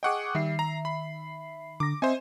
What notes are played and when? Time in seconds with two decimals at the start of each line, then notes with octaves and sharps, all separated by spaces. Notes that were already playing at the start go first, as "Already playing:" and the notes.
0.03 G#4 D#5 F#5 G5 C#6 D6
0.35 D#3 G3 E5 C7
0.59 A#5
0.85 B5
1.80 D3 D6 A#6
2.02 C4 C5 D#5 E5 G#5